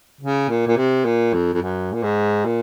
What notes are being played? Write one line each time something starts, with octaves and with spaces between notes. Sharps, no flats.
C#3
A#2
A#2
C3
A#2
F2
F2
F#2
A#2
G#2
A#2